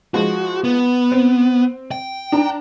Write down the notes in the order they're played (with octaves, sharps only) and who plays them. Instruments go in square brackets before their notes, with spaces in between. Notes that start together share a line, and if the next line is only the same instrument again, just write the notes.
[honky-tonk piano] F3 G#3 [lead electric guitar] F#4
[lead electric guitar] B3
[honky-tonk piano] C4
[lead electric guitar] G5
[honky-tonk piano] D4 A#5